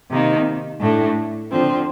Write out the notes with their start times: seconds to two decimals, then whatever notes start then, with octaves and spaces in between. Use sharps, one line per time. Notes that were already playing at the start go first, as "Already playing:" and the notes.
0.11 C3 D#3 A#3 D#4
0.80 A2 A3 D4
1.51 D3 F3 C4